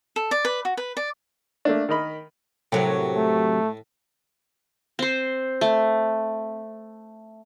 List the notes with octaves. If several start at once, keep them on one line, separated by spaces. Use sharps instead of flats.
A4
D5
B4
F#4
B4
D5
A3 A#3 D4
D#3 A#4 D#5 B5
A2 C3 F#3 A#4
A3
C4 C5
A3